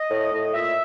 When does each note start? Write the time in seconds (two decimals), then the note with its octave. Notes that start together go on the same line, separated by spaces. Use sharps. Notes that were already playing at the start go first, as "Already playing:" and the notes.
Already playing: D#5
0.10 A2
0.32 A2
0.54 A#2 E5